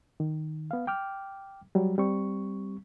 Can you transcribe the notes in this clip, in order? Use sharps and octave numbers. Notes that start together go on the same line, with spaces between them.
D#3
B3 F5
G5 D6 F6
F#3 G3
G3 C4 C#6